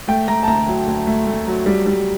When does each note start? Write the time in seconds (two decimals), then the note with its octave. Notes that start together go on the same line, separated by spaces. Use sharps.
0.08 A3 G5
0.28 A3 A#5
0.43 A5
0.48 D2 A#5
0.67 F#3
0.87 D2
1.07 A3
1.27 A3
1.47 F#3
1.66 G3
1.86 G3